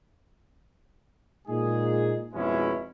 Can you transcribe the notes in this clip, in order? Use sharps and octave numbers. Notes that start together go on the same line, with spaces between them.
A#2 G#3 D#4 G#4
F2 G#2 B2 G#3 C#4 E4